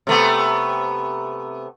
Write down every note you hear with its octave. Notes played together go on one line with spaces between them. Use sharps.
C3 A3 B3